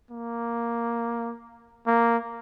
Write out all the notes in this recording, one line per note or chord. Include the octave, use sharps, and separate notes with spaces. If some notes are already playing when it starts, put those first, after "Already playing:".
A#3
A#3